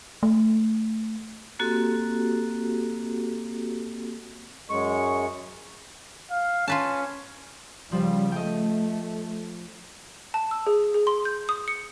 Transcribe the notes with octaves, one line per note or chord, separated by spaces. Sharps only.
A3
A#3 C4 F#4 G4 A4
F#2 G#3 C#6
F5
C#4 F4 B4 A5
C#3 F3 G3
A3 D#5 G5
A5
E6
G#4
G#4
C6
G6
D#6
C#7